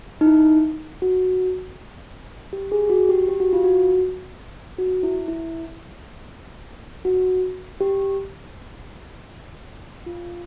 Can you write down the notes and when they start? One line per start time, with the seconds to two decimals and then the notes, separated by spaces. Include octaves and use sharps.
0.21 D#4
0.26 E4
1.02 F#4
2.53 G4
2.72 G#4
2.90 F#4
3.09 G4
3.28 G4
3.40 F#4
3.53 F4
3.64 F#4
4.79 F#4
5.03 E4
5.28 E4
7.05 F#4
7.81 G4
10.06 F4